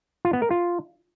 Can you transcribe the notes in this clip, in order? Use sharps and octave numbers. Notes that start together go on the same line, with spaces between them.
F4
B3
A#4
F4